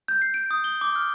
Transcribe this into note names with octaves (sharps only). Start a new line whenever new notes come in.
G6
C7
D7
D#6
G7
D6
F6